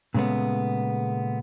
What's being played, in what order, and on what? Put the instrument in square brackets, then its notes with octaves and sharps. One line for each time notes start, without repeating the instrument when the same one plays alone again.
[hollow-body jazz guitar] A#2 C#3 G#3 A3 B3